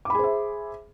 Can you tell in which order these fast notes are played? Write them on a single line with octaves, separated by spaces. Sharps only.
D6 B5 G#4 C5 E5